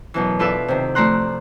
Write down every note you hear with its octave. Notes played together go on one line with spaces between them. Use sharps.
F#2 B2 E3
D4 F4 A4 B4 D5 E5
C3 D#3
F3 A3 D5 A#5 C6 F#6